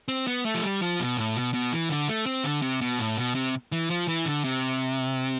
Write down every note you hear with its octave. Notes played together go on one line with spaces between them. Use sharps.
C4
B3
A3
F3
G3
F3
B2
A2
B2
B2
E3
D3
A3
C4
D3
C3
B2
A2
B2
C3
E3
F3
E3
D3
C3